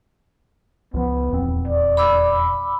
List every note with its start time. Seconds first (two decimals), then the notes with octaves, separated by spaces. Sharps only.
0.94 C#2 F3 B3
1.31 D#1 E2 C4
1.68 D5
1.97 B5 D6 E6